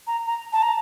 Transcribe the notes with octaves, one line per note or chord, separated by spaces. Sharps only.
A#5
A#5
A5
A#5